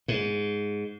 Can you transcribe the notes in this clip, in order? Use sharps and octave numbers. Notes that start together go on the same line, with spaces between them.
G#2